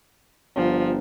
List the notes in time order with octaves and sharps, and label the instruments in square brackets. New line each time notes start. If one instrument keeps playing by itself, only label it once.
[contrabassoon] G1 [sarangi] F3